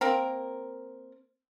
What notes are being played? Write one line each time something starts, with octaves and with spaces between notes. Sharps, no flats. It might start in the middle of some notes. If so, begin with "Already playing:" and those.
A#3 C4 A#4